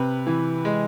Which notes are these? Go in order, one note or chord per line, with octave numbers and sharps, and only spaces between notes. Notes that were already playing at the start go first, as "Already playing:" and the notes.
Already playing: C3 B4
E3
G#3